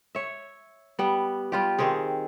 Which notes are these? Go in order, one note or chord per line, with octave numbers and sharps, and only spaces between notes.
C#5 E5
G3 B3
G3 F4 G4
D#3 C4 G4 G#4